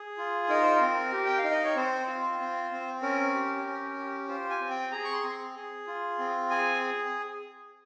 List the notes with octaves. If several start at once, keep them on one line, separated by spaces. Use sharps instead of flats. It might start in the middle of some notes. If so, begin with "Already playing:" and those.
Already playing: G#4
F4
D#4 A#4
C5
A#4
C4
G4
G5
F5
D#4
D#5
C#5
C4 C5
F4
C4
C4
C#4 A#4
G4
C#4
G4
F4 C5
G#5
C4
G5
G#4 A#5
C#6
C6
C4
G#4
F4
C4
G#4 G#5